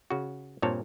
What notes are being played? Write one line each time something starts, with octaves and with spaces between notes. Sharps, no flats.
C#3 F#4
G2 A#2 C4 C#5 A5